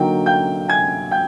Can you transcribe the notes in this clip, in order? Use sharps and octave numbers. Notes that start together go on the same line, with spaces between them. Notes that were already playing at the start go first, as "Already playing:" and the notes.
Already playing: D3 F#3 A#3 D#4 G5
G5 G6
G#5 G#6
G5 G6